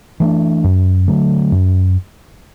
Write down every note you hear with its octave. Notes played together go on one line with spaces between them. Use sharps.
E3 A3 D4
F#2
D3 F#3 A3
F#2